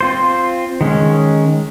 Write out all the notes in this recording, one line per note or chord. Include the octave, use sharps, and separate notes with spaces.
C4 F4 C5
D#3 G#3 C#4